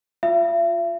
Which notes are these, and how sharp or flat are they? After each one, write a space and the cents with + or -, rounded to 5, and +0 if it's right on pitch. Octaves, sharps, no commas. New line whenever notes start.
F4 +0 E5 +40